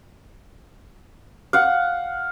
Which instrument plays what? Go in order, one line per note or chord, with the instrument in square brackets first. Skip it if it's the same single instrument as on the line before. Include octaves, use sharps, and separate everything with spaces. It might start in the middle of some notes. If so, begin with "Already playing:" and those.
[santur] F5 F#5